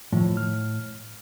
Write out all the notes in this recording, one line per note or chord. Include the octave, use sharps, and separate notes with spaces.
A2 D#3 F3
F6